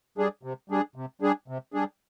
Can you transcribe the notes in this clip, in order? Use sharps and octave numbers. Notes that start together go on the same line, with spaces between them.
G3 D4 G#4
C3
G3 D4 G#4
C3
G3 D4 G#4
C3
G3 D4 G#4